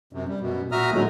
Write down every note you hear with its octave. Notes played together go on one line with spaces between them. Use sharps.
F#2 C3
G3
F#2 B2
A#2 F#4 E5 A#5 D#6 F6
A2 D3 F#3 G#3 A3